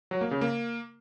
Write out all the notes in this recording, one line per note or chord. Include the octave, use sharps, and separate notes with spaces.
F#3
A#3
C#3
A#3